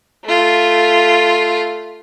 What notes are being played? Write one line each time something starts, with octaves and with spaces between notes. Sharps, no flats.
A3 F4